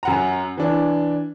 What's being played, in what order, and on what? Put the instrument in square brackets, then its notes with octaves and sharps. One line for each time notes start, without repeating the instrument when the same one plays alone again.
[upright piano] F#2 F#5 A#5
E3 D4